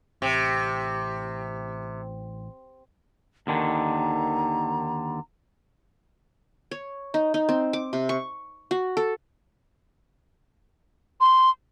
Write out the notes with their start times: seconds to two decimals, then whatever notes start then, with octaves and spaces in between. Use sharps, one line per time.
0.22 A1 C3
3.47 D#2 D3 D#3 A#5
6.71 C#5
7.14 D#4
7.34 D#4
7.49 C4
7.73 D6
7.93 C3
8.09 C#6
8.71 F#4
8.97 A4
11.21 C6